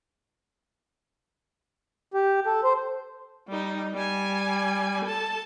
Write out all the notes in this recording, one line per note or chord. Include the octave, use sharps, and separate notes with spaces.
G4
A4
C5
G3 D#4
G3 G#5
A4 A5